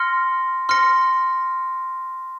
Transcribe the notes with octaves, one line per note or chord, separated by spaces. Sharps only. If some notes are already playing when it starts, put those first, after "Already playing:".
Already playing: C6 F6 A#6 C#7
C6 F6 A#6 C#7